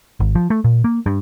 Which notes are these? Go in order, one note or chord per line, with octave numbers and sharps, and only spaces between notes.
G#1
F3
A3
A#2
A#3
G2